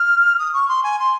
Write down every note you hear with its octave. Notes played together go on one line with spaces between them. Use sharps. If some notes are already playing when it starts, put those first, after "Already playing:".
Already playing: F6
D#6
C#6
C6
G#5
C6